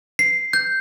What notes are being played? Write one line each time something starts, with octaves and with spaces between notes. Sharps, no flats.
C7
G6